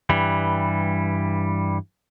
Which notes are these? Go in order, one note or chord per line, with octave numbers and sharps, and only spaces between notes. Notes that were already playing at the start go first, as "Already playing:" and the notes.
G2 E3 G3